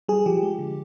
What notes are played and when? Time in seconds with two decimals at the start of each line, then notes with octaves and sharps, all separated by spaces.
0.08 G3 G#4
0.26 F3 G4
0.43 G#3
0.59 D3